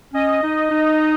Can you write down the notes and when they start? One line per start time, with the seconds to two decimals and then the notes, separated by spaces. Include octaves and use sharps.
0.13 C#4 D#5
0.43 D#4
0.71 D#4